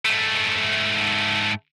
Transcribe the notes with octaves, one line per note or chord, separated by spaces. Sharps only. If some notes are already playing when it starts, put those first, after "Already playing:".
G#2 A3